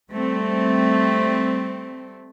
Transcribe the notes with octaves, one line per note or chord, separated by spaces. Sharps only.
G3 A3 C4